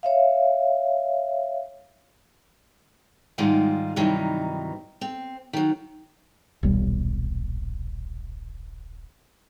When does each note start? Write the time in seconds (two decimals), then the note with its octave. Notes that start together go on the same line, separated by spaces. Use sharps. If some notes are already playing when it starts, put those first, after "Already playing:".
0.03 C#5 E5 F5
3.38 G#2 D#3 G3 G#3 F4
3.96 G2 C3 D#3 E3 F#3 D#4
5.01 C4
5.53 D#3 F#3
6.63 D#1 B1 G3